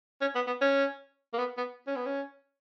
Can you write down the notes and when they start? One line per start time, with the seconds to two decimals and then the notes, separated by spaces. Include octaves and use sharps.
0.21 C#4
0.35 B3
0.47 B3
0.61 C#4
1.33 A#3
1.38 B3
1.57 B3
1.87 C#4
1.96 B3
2.06 C#4